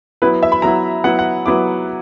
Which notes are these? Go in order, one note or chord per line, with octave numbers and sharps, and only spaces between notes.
F#3 B3 E4 B4
E5
B5
F#3 B3 E4 A#5
F#3 B3 E4 F#5
F#5
F#3 B3 E4 D6